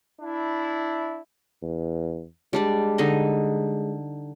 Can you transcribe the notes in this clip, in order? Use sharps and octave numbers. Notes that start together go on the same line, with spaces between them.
D4 E4
E2
G3 G#3 D4 D5
D3 D#4 D#5